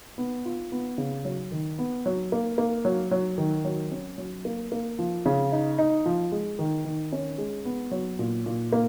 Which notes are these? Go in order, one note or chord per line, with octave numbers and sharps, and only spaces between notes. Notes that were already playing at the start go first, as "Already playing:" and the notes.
B3
F4
B3
C#3
F#3
D#3
B3
F#3
A#3
A#3
F#3
F#3
D#3
F#3
C#4
F#3
A#3
A#3
F3
C#3
D#4
D#4
F3
G#3
D#3
D#3
C#4
G#3
B3
F#3
A#2
A#2
A#3